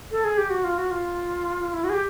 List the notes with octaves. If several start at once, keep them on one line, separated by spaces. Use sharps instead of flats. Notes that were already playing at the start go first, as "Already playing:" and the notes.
A4
G#4
G4
F#4
F4
F#4
F4
E4
F#4
G#4
G4